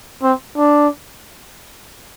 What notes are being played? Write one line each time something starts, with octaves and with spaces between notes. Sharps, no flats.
C4
D4